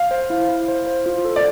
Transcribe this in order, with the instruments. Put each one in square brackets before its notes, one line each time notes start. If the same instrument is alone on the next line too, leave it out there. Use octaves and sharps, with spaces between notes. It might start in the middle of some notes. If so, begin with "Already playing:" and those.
Already playing: [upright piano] F5
[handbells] C5
E4
E4
C5
C5
F4
A4
[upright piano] D5